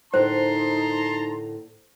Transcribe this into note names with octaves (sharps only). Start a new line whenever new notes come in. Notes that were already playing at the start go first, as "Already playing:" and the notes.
A2 D3 D#4 A#4 C5 A5 A#5 C6